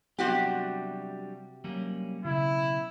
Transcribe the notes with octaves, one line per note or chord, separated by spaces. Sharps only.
C3 F#3 G3 B3 D4 F#4 G4
F#3 G3 A#3 C#4
B1 C#3 E4